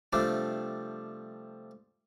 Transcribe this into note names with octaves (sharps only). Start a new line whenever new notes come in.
C3 F3 G3 A3 D4